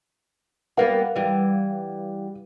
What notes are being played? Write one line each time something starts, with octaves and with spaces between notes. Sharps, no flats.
G3 A#3 B3 B4 F5 F#5
E3 G3